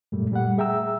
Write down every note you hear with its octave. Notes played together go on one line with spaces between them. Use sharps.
F#2 A#2 G3 A3
A#2 G3 A3 F#5
G#4 E5 G5 A#5 E6